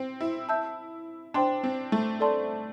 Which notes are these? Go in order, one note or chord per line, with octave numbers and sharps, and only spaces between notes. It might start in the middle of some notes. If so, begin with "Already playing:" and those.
Already playing: C4
E4
E5 A5 E6 G6
D4 C5 G5 C6
C4
A3
A4 D5 A5 C6